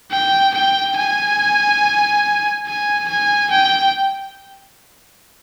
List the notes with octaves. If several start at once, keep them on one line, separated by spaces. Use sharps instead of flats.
G5
G5
G#5
G#5
G#5
G5